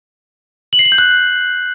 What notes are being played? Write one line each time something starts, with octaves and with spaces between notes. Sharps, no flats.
F#7
C7
F#7
G6
F#6